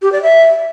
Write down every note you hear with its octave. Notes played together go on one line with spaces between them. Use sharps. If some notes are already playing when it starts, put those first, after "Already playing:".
G4
D5
E5